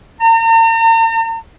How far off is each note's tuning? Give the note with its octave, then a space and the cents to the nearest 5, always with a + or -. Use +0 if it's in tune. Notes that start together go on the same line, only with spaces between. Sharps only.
A#5 -45